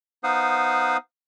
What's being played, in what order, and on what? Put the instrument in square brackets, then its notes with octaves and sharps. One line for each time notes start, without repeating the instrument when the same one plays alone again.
[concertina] B3 D#4 C5 F5 F#5 D#6